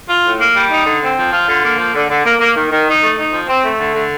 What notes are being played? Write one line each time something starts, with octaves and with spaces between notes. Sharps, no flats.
F4
A2
A#3
G3
D#4
D3
C4
F3
F4
D3
A#3
F3
D3
D3
A#3
A#3
D#3
D#3
D#4
A3
D#4
F3
C4
A3
D3
D3